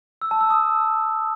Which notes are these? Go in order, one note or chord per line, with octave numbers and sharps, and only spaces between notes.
E6
A5
E6
D#6